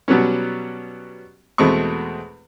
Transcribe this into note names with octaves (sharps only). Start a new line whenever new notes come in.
B2 F#3 G3 B3 C#4
E2 B2 G#3 A3 C4 C#6